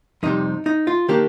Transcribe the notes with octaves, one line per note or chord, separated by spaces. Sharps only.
F2 C3 G3 D#4
D#4
F4
D#3 A#3 D4 G4